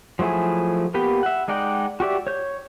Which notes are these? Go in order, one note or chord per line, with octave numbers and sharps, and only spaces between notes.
F3 F#3 A3 E4 G#4
A#3 B3 G4 B4 G5
E5 F#5
G#3 D#4 D5 F#5 G5
F#4 G4 D5 E5
C#5 G6